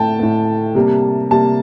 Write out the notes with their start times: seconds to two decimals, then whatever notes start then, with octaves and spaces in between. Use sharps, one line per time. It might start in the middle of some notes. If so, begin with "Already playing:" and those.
Already playing: A2 A3 G5 A5
0.19 A2 A3
0.75 C3 G3 A#3
1.31 C3 G3 A#3 A5